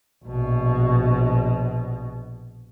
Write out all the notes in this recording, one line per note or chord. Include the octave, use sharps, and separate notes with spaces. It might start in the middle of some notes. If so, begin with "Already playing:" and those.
A#1 B2